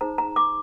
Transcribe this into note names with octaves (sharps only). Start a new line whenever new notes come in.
D#4 G#4 C5 A#5
A#5
D6